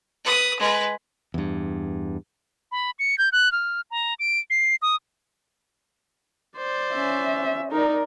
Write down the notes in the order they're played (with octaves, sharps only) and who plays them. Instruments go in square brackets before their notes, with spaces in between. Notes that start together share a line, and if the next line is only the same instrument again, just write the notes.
[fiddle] B4 D#6
G#3 B4
[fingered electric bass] E2 G2
[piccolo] B5
C#7
G6
F#6
F6
A#5
D7
C7
D#6
[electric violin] C5 D5
[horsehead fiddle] C#4 E5
[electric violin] D#4 [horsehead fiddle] A#4 D5